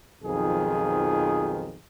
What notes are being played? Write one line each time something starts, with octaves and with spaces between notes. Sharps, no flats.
B1 F2 D#3 F3 G#4